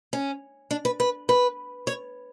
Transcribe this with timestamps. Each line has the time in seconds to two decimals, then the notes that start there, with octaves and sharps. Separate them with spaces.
0.13 C#4
0.71 D4
0.85 B4
1.00 B4
1.29 B4
1.87 C#5